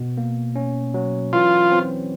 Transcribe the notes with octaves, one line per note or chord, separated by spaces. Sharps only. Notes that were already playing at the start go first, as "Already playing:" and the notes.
Already playing: B2
A#3
C#4
F#3
E3 F4
C4